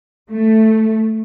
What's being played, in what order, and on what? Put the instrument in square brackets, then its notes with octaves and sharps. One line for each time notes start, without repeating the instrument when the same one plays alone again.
[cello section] A3